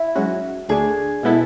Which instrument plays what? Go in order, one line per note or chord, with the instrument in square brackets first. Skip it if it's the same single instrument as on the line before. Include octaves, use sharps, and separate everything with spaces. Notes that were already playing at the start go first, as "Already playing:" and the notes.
Already playing: [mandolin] E4
[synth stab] G#2 F#3 C#4 F#4
[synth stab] D2 D3 A3 D4 [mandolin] G#4
[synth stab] B2 G#3 B3 E4 A4